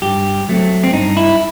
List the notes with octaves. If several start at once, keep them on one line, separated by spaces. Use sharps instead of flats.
G2 G4
F#3 A3 C4
C4
G2 D#4
E4